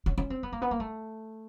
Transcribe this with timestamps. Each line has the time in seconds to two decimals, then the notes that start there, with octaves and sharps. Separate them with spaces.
0.06 C#4
0.18 C#4
0.30 C4
0.43 B3
0.52 A#3
0.62 B3
0.71 A#3
0.80 A3